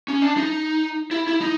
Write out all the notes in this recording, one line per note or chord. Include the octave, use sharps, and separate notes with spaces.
C#4
D4
D#4
E4
E4
D#4